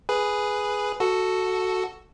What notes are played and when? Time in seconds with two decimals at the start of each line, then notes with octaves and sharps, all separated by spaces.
0.09 G#4 B4
1.00 F#4 A4